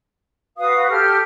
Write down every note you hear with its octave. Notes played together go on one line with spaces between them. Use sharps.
F#4 B4 F5 D#6
G4 A4 F6